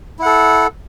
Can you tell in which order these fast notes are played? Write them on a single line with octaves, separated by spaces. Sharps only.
E4 F#5 A4